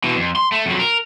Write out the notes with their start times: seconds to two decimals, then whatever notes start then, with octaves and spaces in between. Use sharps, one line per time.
0.04 B2 E3
0.16 F2
0.36 C6
0.52 A3
0.66 F2 F#3
0.79 A#4